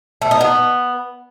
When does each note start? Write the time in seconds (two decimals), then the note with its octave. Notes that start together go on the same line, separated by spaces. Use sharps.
0.22 A3
0.31 D#4
0.41 B3